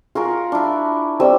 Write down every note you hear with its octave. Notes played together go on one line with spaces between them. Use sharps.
F4 F#4 G#4 A#4
D4 E4
G3 C4 E6